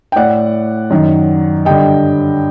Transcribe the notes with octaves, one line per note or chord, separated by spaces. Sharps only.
G5
A2 D5 F#5
F#2 D#3
G2 D3 D#5 G5